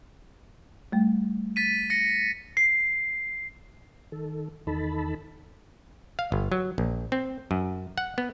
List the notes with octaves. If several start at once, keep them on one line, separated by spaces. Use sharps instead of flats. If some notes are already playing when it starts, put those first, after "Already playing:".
G3 A3
A6 B6 D#7
A#6 C#7
C7
D#3 A4
E2 D#3 D#4 A4 A5 B5
F5
G1
F#3
A#1
C4
F#2
F#5
B3